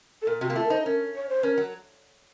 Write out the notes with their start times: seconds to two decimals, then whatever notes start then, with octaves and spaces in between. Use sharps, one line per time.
0.22 A4
0.27 A#2 A#4
0.41 C3 F#4
0.50 A#3
0.56 A3 F4
0.64 A#4
0.70 D#4 C5
0.85 C#4 A#4
1.16 C#5
1.29 C5
1.43 C#4 A#4
1.58 F#3